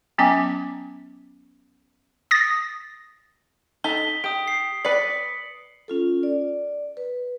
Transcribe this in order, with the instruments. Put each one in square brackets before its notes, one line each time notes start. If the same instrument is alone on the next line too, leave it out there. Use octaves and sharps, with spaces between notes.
[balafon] F#3 B3 C#4 G5 A5 D6
[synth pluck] D#6 A6 A#6
[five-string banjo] D#4 A4 [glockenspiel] B6 G7
[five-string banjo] G4 [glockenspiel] D#6 D7
[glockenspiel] C7
[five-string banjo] B4 D5 [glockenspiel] B6 C#7 F#7
[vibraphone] C#4 F4 A4
D5
B4